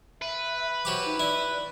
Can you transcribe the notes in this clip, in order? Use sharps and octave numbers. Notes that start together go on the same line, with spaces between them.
B4 E5
F#3 G4 C5 D6
D#4
E4 D5